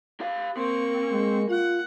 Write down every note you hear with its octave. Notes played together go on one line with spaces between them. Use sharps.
G4 F5
A#3 C4 C#6
G#3
F4 F#5